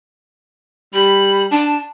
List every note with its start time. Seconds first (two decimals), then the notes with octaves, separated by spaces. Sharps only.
0.93 G3 B5
1.51 D4 A5